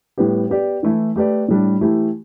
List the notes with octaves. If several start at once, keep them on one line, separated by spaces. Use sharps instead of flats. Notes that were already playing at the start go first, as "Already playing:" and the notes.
A2 G3 B3 G4
B3 G4 D5
E3 A3 E4
A3 G4 B4 D5
A2 G3 D4
E3 A3 E4 G4